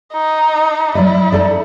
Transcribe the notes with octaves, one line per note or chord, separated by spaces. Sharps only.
D#4
F#3 E4 D5 D#5
D#4 A4 D5